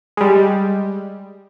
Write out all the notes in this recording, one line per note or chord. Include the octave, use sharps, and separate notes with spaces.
G3 G#3